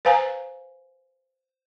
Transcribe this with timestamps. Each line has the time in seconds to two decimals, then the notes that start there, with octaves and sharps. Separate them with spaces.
0.05 B4 C5 F5 G#5 A#5